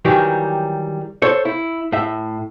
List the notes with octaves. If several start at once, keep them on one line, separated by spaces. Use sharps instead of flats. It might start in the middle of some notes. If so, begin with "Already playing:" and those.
D#3 E3 F#3 G3 G4
A4 C5 C#5
E4
A2 E5